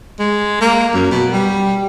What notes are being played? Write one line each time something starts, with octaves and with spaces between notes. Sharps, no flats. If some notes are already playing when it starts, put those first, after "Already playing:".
G#3
A#3
F#2
B2
G3